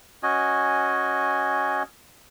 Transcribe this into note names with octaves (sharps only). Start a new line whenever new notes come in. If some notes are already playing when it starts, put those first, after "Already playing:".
C#4 F#4 D#5 G#5